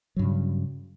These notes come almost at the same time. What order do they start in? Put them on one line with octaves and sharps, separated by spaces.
F#3 G2 C#3